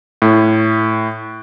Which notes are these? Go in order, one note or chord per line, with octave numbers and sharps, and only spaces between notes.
A2